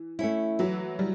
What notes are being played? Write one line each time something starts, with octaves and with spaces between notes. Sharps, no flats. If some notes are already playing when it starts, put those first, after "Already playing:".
Already playing: E3
A3 C#4 E4
E3 F#3
G3